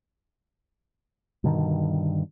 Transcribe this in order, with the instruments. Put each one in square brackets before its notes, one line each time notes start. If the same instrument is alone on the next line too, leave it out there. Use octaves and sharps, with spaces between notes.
[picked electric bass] G2 B2 D3 D#3